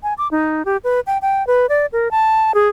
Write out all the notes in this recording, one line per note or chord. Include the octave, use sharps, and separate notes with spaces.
G#5
D6
D#4
G4
B4
G5
G5
B4
D5
A#4
A5
G#4